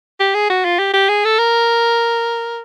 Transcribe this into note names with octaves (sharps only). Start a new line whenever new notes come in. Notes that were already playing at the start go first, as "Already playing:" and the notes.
G4
G#4
F#4
F4
G4
G4
G#4
A4
A#4